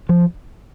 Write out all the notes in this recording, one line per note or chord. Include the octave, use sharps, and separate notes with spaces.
F3